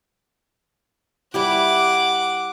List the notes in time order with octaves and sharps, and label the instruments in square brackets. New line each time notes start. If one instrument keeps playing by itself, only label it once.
[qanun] G3 E4 G4 [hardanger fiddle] F#5 D6